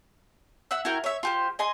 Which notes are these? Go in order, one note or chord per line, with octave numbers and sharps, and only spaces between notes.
E5 F#5 E6
E4 F#4 A#4 G5
C#5 E5
F4 G4 C5
D#5 G#5 C6